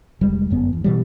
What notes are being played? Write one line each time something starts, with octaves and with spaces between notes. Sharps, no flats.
F1 G3 G#3
G1 F#2 B3
E2
B2 E3 G3